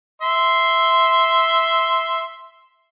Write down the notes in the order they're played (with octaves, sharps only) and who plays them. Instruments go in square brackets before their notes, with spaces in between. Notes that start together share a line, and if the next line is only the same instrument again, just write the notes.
[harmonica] E5 C6